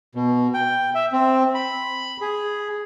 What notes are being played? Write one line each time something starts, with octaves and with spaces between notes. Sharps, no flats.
B2
G5
E5
C4
B5
G#4